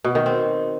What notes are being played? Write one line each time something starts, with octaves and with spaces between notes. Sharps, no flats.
B2
D#3
C4